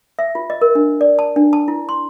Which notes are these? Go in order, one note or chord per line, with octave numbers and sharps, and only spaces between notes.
E5
F4
D#5
A#4
D4
D5
A5
D4
A5
E4
C6